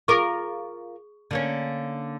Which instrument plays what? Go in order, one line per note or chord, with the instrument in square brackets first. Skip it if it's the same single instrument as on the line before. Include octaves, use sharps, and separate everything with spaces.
[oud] F4 A#4 [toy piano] G#4 C#6
[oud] D3 A#3 C#4